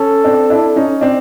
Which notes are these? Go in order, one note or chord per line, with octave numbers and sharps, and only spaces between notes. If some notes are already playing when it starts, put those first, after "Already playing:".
Already playing: C#4 A4
C4 D4
D4 E4
C#4 D#4
C4 D4